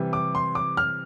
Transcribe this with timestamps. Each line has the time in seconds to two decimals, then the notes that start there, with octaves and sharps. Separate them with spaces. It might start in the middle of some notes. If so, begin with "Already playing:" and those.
Already playing: C3 E3 G3
0.13 D6
0.35 C6
0.55 D6
0.77 F6